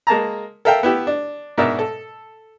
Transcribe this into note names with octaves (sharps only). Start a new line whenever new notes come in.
G#3 A#3 A5 A#5
A4 A#4 E5 F5 G5
B3 E4 G4
D4
G#2 B2 D4 A#4 D5 E5
A4